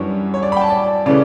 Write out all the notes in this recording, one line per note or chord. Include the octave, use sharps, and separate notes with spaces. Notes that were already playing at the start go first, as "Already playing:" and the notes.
Already playing: F#2 E3 G3 D4 C#5
C#5
D5
B5
G5
A5
D5
C#3 E3 A3 C#4 D5